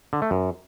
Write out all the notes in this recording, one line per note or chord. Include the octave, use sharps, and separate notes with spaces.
D3
A3
F#2